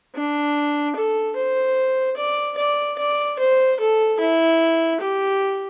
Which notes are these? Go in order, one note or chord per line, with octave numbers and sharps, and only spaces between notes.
D4
A4
C5
D5
D5
D5
C5
A4
E4
G4